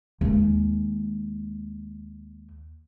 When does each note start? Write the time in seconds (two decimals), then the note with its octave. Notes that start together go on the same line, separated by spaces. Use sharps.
0.21 D#2 G#3